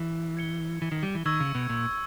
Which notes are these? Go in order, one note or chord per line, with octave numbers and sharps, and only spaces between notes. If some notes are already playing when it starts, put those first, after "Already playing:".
Already playing: E3
G#6 C#7 G7
E3
D#3
G3
E3
D#3 C#6 E6 G#6
C#3
B2
A#2